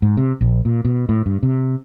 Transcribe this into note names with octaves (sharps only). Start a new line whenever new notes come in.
G#2
C3
A#1
A#2
B2
A2
G2
C3